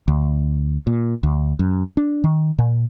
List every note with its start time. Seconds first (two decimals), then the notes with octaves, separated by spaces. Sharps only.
0.08 D2
0.87 A#2
1.23 D2
1.59 F#2
1.97 D4
2.24 D#3
2.58 A#2